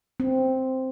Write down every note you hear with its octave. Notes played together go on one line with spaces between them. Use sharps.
C4